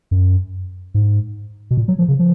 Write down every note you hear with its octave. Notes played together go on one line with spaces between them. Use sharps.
F#2
G#2
B2
A#2
F#3
F3
C#3
F3